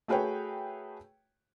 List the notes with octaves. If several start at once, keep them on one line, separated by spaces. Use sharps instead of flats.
A3 F#4 G#4 B4 C#5 G5